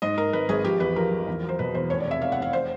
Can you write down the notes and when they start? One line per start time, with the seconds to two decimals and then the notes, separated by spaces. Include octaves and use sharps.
0.02 G#2 D#5
0.18 G#2 A#4
0.33 G#1 B4
0.49 G#1 G#4
0.64 F3 G4
0.80 E2 B4
0.96 F3 A#4
1.12 F3
1.27 E2
1.43 F#3
1.49 C5
1.59 B2 B4
1.75 E2 C5
1.90 F1 C#5
2.00 D5
2.06 C3 E5
2.22 F1 F5
2.32 F#5
2.37 F1
2.42 F5
2.53 C5